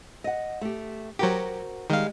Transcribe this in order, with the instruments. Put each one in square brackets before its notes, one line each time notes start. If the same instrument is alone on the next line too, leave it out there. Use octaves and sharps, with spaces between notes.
[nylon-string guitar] D#5 F#5
A3 G4
[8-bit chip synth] F#3 G4 [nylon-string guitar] F#4 A#4 C5
[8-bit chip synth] D#3 F5 [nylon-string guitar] G3 G#3